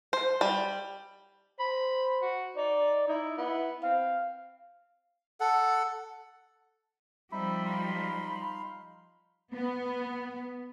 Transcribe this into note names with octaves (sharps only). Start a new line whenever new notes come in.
C5
G3
C5 B5
F#4
D#4 D5
D#4 E4
B3 E4
C4 F5
A4 F#5
F3 G3 C4 D#4 E5 B5
D#4 F5 B5 C6
B3